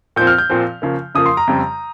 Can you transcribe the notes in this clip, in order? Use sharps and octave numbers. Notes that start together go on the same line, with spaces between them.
A#2 F3 C4 G6
F6
G6
A#2 F3 C4
C#3 F3 A#3
C#3 F3 A#3 D#6
C6
A#5
F2 C#3 G3 C4